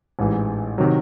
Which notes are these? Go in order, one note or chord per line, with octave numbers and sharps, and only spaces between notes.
A1 G#2 E3
C3 D#3 F#3